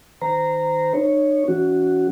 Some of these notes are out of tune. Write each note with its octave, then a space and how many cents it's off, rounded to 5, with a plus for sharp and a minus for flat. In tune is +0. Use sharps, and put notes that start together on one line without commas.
D#3 +0 C5 -25 A#5 -10
D#4 -40 C#5 +0
E3 +0 C#4 +30 F#4 +0